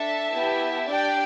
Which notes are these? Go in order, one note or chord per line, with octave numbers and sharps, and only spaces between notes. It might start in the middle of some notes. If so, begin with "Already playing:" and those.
Already playing: D4 A4 E5 A5
B3 E4 G4
D4 G4 D5 G5